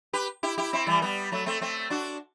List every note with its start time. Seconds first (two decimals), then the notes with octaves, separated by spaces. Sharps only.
0.13 G4 B4
0.43 E4 G4
0.58 E4 G4
0.73 C4 E4
0.87 E3 G3
1.02 G3 B3
1.32 F#3 A3
1.46 A3 C4
1.61 A3 C4
1.90 D4 F#4